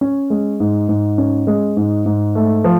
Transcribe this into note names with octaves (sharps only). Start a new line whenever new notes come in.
C#4
G#3
G#2
G#2
C#4
G#3
G#2
G#2
A3
F3